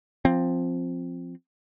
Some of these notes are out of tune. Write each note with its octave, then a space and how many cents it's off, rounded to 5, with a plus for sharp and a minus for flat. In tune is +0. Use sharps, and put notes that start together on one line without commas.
F3 +0 C4 +0